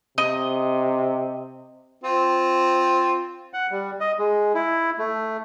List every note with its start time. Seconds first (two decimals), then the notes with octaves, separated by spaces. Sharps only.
0.18 C3 D#5
2.04 C4 F4
3.54 F#5
3.71 G3
4.00 D#5
4.18 G#3
4.54 E4
4.99 A3